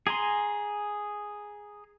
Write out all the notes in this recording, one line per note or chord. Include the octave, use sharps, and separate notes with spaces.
G#4 G#5 A#5 C6